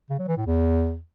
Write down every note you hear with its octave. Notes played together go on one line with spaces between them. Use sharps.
C#3
F#3
E3
A2
E2